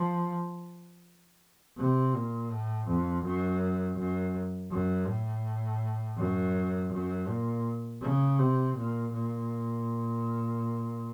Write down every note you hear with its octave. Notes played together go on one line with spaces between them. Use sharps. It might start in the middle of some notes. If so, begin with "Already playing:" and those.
Already playing: F3
C3
A#2
A2
F2
F#2
F#2
F#2
A2
F#2
F#2
A#2
C#3
C3
A#2
A#2